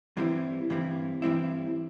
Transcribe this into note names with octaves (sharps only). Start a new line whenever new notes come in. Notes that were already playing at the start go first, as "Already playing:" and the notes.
G2 E3 G3 C4 E4
G2 E3 G3 C4 E4
G2 E3 G3 C4 E4